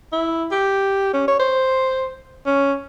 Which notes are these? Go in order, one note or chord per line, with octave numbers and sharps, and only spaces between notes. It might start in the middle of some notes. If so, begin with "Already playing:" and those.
E4
G4
C#4
C#5
C5
C#4